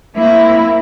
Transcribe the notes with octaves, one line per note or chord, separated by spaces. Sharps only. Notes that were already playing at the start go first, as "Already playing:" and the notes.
A#3 C4 E4